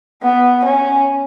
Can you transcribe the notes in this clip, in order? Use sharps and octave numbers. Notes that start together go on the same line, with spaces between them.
B3
C#4